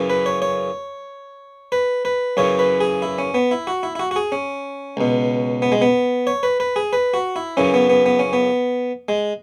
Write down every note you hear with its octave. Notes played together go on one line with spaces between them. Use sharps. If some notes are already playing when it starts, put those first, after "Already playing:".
Already playing: F#2 C#3 E3
B4
C#5
C#5
B4
B4
F#2 C#3 E3 C#5
B4
G#4
E4
C#4
B3
E4
F#4
E4
E4
F#4
F#4
G#4
C#4
C#2 B2
B3
G#3
B3
C#5
B4
B4
G#4
B4
F#4
E4
F#2 C#3 E3 C#4
B3
B3
B3
C#4
B3
G#3